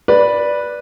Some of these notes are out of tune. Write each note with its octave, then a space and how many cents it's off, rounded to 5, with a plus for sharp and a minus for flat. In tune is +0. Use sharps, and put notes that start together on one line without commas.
B4 -10 D5 +0